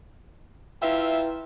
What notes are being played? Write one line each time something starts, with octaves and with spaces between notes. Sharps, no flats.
E4 F4 B4 E5 G5